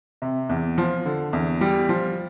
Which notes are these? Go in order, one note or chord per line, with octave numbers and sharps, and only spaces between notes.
C3
E2
F3
D3
E2
G3
F3